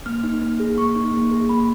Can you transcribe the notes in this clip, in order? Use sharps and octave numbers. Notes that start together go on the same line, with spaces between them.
A#3 F6
D#4
A#3
G#4
A#3 C#6
D#4
A#3
G#4
A#3 B5